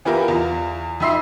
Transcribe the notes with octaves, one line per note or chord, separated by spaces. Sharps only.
E3 B3 E4 F4 G4 A#4
E2 F4
F2 D#4 E5 C6 C7